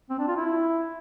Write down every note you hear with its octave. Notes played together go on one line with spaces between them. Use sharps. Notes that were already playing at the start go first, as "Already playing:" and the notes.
C4
D4
F4
E4